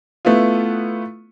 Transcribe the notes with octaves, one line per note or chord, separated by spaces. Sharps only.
A3 B3 E4 F4